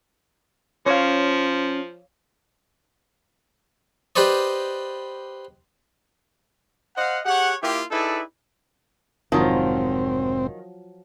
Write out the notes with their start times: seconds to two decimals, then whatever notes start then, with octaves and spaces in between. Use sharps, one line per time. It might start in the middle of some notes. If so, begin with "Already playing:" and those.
0.86 F3 C#4 C#5 F5
4.16 G4 B4 C5 D5 D#5
6.96 C5 D#5 F5 F#5
7.25 G4 G#4 C#5 F#5
7.63 A#3 E4 F4 G4
7.91 D#4 E4 G#4 A4 B4 D5
9.32 F1 G#2 D#3 F3 F#3 C4 F4